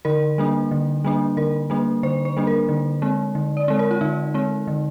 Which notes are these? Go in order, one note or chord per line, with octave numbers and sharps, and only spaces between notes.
D3 A#4
G3 A#3 D4
D3
G3 A#3 D4
D3 A#4
G3 A#3 D4
D3 C5
C5
G3 A#3 D4
A#4
D3
G#3 C4
D3
D5
G#3 C4
A#4
F4
D3 D#4
G#3 C4
D3